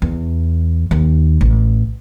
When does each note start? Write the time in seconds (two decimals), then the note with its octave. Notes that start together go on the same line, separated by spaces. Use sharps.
0.02 E2
0.91 D#2
1.41 A1